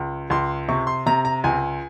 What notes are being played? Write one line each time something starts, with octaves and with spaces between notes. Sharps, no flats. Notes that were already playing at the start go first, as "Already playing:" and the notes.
Already playing: C#2
C#2 C6
C3 C#6
C6
C3 A#5
A#5
C#2 G#5